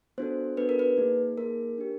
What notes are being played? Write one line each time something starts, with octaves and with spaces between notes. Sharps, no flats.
B3 D4 F#4 A4 C5
B3 D4 F#4 A4 B4
A#4
B4
A#3 D#4 G#4
A#3 D#4 G#4 A#4
D4 G4